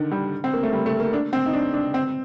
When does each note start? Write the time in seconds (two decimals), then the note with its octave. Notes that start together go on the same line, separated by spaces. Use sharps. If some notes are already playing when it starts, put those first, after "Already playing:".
Already playing: D3 D#3
0.11 G3
0.44 C4
0.54 A#3
0.63 A3
0.73 G3
0.86 A3
1.00 A#3
1.13 D4
1.33 C4
1.46 D#4
1.54 D4
1.74 D4
1.94 C4